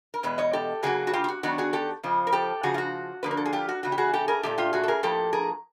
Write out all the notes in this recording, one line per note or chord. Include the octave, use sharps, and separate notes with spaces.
A#4
E2 B2 G#3 B4
C#5 D#5
G4 A4
C#3 F#3 A#3 F#4 G#4
F#4
F4 G4
F4
F#4
D#3 F#3 B3 D4 F#4
F#4 G#4
G4 A4
F2 C#3 F3
A#4
G4 A4
C#3 F3 F#4 G#4
F4
F#4
D3 F3 A#3 B4
A#4
A4
G#4
F4 G4
F#4
E2 C#3 F#4
G4
F#4 G#4
G4 A4
G#4 A#4
A#2 F#3 A3 G4 A4
F4 G4
F#4 G#4
A4
G#4 A#4
A2 F3 A#3 G4 A4
G#4 A#4